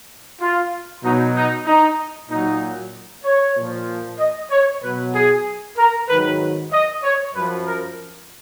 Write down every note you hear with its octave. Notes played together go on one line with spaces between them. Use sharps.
F4
B2 F#3 D#4
D#4
D#4
A#2 F#3 D#4
C#5
A#2 F3
D#5
C#5
B2 F#3 B4
G#4
A#4
G#2 D#3 F#3 B4
D#5
C#5
F#2 F3 B4
A#4